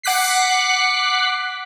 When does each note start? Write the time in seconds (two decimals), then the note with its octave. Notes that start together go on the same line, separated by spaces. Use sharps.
0.03 F#5 D6 F#6 B6 C7